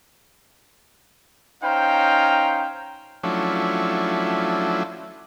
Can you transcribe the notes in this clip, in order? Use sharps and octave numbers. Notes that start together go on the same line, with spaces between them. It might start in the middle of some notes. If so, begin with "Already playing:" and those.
C#4 D#4 C5 F5 G5 A#5
F3 F#3 A3 C#4 D4 E4